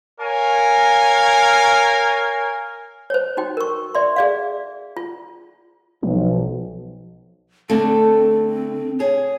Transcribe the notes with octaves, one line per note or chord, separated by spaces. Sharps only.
A#4 C#5 F5 G#5
C5 C#5
D#4 F#4 G5
A#4 C#6
D5 E5 C6
G#4 D5 F5
F4
B1 F3
D3 A3 C4
G#4 C#5